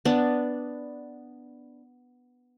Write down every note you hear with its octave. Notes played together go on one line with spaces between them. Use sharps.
B3 D4